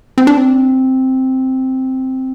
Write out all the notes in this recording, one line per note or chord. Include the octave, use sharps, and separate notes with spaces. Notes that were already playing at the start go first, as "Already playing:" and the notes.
C4
D4
C4